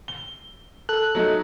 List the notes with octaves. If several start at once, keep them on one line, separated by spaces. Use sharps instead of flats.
G7
A4 F#6
F#3 A3 D#4